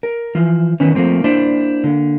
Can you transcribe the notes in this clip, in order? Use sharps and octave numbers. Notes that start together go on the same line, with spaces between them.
A#4
E3 F3
D#3 E3 B3 C#4
F3 A3 A#3 C4
A#3 D4 E4 C5 D5
D3 A#3